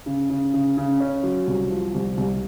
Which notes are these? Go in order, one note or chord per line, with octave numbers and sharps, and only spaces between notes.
C#3
C#3
C#3
C#3
C#4
F#3
C2
F3
C2
C2